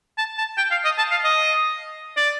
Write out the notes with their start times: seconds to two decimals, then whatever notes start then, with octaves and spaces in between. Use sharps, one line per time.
0.18 A5
0.38 A5
0.57 G5
0.71 F5
0.85 D#5
0.98 A5
1.11 F5
1.24 D#5
2.17 D5